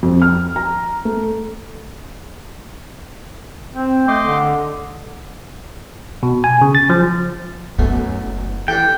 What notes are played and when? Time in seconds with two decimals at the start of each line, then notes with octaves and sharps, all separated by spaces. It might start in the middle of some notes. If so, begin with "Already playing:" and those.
0.03 F2
0.22 F6
0.56 A#5
1.05 A3
3.74 C4
4.08 A3 D#5 C6 D6
4.26 D3
6.23 B2
6.44 G#5
6.61 C#3
6.75 A6
6.90 F3
7.79 F#2 B2 A3 B3 G#5
8.21 F#1
8.68 E3 D4 G4 A4 G5